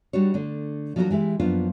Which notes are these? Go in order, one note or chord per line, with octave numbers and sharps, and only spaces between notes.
G3 D4 F#4 C#5
D3 A3 D4
F3 F#3 D4 D#4 F#4 A#4
E3 G#3 G4 E5
F#2 F3 A#3 B3 D4 F4